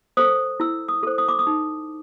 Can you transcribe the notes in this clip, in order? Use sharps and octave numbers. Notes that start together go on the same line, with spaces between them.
A4 C5 D#6
E4 E6
D#6
A4 C5
D#6
D6
D#6
D#4